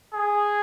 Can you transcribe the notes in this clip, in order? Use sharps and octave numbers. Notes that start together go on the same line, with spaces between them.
G#4